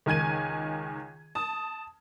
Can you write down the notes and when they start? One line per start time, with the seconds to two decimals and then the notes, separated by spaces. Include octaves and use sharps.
0.06 C#2 D#3 G#5 G#6 D#7
1.35 A5 D#6